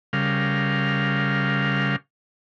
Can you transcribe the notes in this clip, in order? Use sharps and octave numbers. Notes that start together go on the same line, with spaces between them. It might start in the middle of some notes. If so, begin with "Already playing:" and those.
C#3 G3 A#4 F5